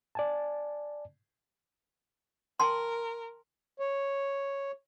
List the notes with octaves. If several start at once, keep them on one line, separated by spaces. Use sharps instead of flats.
D5 G#5 A5
A#4 G5 A5 C6
C#5